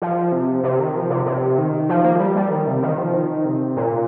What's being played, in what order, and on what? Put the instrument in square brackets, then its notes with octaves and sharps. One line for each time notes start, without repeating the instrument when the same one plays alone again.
[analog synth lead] F3
C3
C3
D#3
F3
C3
C3
D#3
F3
A#3
F3
G3
G3
D#3
C3
D#3
F3
D#3
C3
A#2